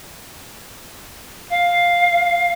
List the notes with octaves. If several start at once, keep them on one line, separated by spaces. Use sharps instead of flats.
F5